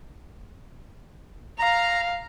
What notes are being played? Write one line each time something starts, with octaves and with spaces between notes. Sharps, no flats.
F5 A#5